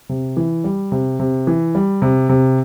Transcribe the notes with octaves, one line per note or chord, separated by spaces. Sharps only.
C3
E3
G3
C3
C3
E3
G3
C3
C3